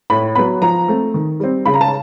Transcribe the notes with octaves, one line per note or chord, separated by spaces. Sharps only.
A2 B5
F#3 B3 B5
F3 A#5
A3 C4
D#3
G3 C4
C#3 B5
A#5
A5